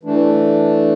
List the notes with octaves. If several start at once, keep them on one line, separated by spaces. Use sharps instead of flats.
E3 A3 D4